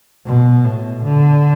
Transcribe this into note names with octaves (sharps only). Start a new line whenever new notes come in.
B2
A2
D3